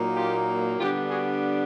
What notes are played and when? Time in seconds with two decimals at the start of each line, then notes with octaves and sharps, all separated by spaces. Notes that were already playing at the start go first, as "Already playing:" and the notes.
Already playing: A#2 F#3 A#3 D#4
0.16 F4 G4
0.79 D3 G3 B3 D4 F4 G4
1.10 F#4 G#4